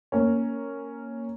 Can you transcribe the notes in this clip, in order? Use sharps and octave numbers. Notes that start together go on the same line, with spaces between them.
A#3 C#4